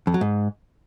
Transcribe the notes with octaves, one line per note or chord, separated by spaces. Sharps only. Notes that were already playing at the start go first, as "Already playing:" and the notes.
F2
F#3
G#2